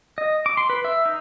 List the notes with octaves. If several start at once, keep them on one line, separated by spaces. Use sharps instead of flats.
D#5
D6
C6
B4
E5
D#4